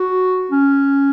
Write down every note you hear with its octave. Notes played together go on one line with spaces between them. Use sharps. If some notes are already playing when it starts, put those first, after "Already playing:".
Already playing: F#4
C#4